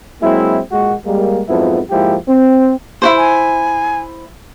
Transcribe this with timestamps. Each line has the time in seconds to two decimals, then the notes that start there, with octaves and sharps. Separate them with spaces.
0.21 F#3 G#3 A#3 C4 E4
0.72 A#2 G#3 F#4
1.05 G3 G#3 A#3
1.47 F2 G#2 F3 F#3 B3 E4
1.90 G#2 F3 G#3 A#3 E4 G4
2.28 C4
3.02 E4 F#4 C5
3.18 G#5